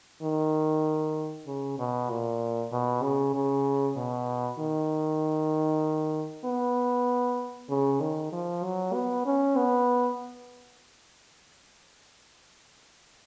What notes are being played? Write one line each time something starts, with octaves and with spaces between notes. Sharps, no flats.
D#3
C#3
B2
A#2
B2
C#3
C#3
B2
D#3
B3
C#3
D#3
F3
F#3
B3
C#4
B3